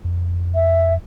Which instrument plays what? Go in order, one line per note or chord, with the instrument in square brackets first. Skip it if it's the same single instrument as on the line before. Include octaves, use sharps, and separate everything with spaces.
[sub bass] F2
[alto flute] E5